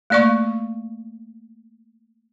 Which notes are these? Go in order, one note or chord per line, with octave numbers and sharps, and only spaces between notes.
A3 A#3 D5 F5 C#6